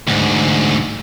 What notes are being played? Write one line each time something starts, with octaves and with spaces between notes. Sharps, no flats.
D2 G#2